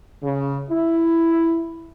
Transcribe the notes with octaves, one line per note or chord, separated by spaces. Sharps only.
C#3
E4